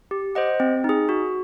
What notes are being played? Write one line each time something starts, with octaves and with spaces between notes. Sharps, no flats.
G4
C5 D#5 F#5
C4
D#4 G#4
F#4